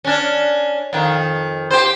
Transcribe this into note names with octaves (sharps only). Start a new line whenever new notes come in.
C#4 D4
F2 D#3
G4 C5